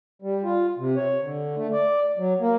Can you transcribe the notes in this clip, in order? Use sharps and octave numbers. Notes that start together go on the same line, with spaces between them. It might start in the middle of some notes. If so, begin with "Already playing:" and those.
G3
F4
C3
C#5
D3
A3
D5
F#3
A#3